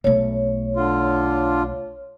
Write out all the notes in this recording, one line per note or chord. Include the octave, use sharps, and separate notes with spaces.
B1 A3 C#5
D3 F4